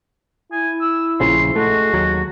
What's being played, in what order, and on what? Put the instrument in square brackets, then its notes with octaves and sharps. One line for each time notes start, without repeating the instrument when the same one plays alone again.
[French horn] E4 [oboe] G#5
[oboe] E6
[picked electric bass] A#1 C#3 F3 [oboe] C6
[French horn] G#3 [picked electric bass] A3 [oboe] F#4
[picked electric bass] D#2 F#3